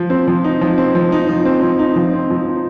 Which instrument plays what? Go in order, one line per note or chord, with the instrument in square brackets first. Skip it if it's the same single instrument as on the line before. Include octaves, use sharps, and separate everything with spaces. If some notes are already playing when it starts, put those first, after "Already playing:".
Already playing: [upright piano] F3
C4
F3
D#4
F3
C4
F3
D#4
F3
C4
F3
D#4
F3
C4
F3
D#4